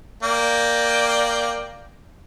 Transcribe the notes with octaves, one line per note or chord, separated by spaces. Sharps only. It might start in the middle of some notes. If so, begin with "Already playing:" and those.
A#3 D5 G5